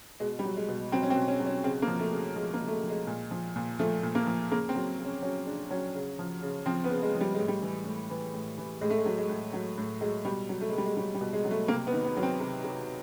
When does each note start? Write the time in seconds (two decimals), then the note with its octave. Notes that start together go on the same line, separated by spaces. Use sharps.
0.20 B2 G#3
0.39 G3
0.45 F#3
0.57 G#3
0.68 B2
0.92 F#3 C4
1.03 C#4
1.10 C4
1.16 B2
1.28 C#4
1.40 F#3
1.46 C#4
1.64 C#3 C4
1.82 A#3
1.88 F3
2.00 A3
2.11 C#3
2.36 F3 G#3
2.54 A#3
2.59 C#3
2.68 A3
2.72 G#3
2.83 F3
2.90 G#3
3.07 A#2
3.31 F3
3.56 A#2
3.79 F3 A3
4.03 A#2
4.15 A#3
4.27 F3
4.51 C#3 A#3
4.69 C4
4.75 F#3
4.99 C#3
5.05 C#4
5.22 F#3 C#4
5.46 C#3 D4
5.70 F#3 C#4
5.95 C#3
6.19 F3
6.42 C#3
6.66 F3 C4
6.84 B3
6.91 C#3
7.03 G#3
7.15 F3
7.21 G3
7.34 A2 G#3
7.48 G3
7.62 E3
7.85 A2
8.10 E3
8.34 A2
8.58 E3
8.81 A2 G#3
8.90 A3
8.99 G#3
9.06 F#3
9.18 G#3
9.29 A2
9.53 F#3
9.78 A2
10.01 F#3 G#3
10.25 B2 G3
10.49 F#3
10.61 A3
10.69 G#3
10.73 B2 G3
10.86 G#3
10.96 F#3 G3
11.14 G3
11.21 B2
11.33 G#3
11.45 F#3
11.51 A3
11.68 C3 A#3
11.87 B3
11.93 D#3
12.04 B3
12.17 F#3
12.23 C4
12.40 C3
12.64 C3